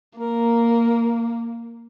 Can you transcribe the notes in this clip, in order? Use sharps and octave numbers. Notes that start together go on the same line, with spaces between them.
A#3 A#4